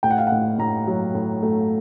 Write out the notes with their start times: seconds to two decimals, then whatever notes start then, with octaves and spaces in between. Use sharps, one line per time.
0.03 A2 G5
0.10 F#5
0.18 F5
0.27 A2 F#5
0.59 A2 A#5
0.87 F#3
1.15 A2
1.43 A3